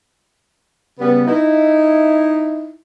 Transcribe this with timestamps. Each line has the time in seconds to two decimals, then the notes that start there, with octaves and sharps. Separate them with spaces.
1.00 C#3 G3 B3
1.27 D#4 E4